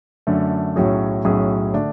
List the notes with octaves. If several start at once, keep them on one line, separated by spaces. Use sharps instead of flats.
F#2 D3 A3
B1 A2 F#3 C#4 G#4
B1 A2 F#3 C#4 G#4
D3 A3 D4